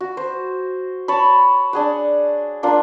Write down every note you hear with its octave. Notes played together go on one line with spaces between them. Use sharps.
F#4
C5
C#5 A5 B5
D4 G#4 F#5
A#3 D4 F4